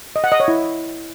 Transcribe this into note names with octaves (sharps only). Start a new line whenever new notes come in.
D#5
F#5
D#5
C#5
E4